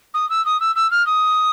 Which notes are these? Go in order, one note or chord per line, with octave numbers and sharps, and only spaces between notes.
D#6
E6
D#6
E6
E6
F6
D#6